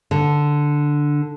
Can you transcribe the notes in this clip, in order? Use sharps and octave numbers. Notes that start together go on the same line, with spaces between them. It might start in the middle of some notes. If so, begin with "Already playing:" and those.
D3